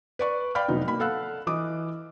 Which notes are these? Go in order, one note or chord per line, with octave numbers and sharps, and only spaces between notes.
B4 D5 C#6
D5 F5 G5 B5 F6
F1 F#3 B3 D#4
A#3 B5
A4 F5 F#5 E6 F#6
E3 D#5 D6 D#6